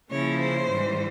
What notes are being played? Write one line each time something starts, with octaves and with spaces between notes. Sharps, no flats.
C#3 F3 A#3 C#4 E4 C#5
C5
G#2 E3 G3